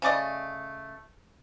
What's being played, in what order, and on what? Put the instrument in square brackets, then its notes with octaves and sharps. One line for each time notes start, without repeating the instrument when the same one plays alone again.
[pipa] C#3 A3 D5 D#5